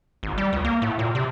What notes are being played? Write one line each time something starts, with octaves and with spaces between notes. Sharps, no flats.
G#1
G3
C#2
A#3
A2
A#2
C3